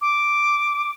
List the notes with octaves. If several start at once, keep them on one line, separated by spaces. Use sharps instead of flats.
D6